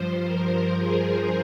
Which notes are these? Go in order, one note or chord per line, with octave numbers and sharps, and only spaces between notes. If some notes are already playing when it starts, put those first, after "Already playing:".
Already playing: G2 F3 C5
A#4
G#4